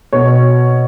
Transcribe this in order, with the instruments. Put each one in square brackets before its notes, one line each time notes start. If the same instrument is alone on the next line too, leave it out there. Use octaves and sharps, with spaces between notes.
[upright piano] B2 C#5